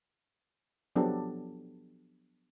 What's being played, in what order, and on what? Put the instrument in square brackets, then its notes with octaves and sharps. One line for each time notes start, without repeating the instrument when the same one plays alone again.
[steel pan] F3 F#3 B3 D4 G4 A4